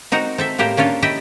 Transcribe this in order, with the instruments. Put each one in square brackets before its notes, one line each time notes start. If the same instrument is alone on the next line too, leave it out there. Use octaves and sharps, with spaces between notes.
[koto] C4 D#4 F#4 A#4
C4 A4 E5
A2 A#3 G4 A#4 C5
A#3 C#4 D4 F4
E4 G4 D#5 G5